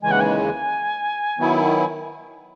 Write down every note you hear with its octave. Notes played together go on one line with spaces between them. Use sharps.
D#2 C#3 E3 G#3 G#5
F#5
G#5
D#3 F#3 B3 E4